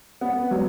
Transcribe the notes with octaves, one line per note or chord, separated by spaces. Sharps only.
B3
F#3